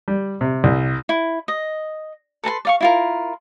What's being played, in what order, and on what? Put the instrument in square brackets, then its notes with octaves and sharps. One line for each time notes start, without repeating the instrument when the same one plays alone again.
[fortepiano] G3
C3
C2
[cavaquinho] E4
D#5
A4 B4 A5 C6
D5 F5 C#6
E4 F4 A#4